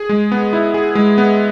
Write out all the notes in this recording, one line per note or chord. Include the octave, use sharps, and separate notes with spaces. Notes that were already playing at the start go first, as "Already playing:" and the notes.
Already playing: G#4
G#3
B3
E4
G#4
G#3
B3